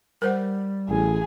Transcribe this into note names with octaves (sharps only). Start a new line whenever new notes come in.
G3 A#4 C5 F#5
A1 G#4 G#5